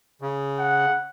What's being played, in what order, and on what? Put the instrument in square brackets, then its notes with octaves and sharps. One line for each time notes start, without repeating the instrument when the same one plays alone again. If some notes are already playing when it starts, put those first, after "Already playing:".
[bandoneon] C#3
[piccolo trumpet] F#5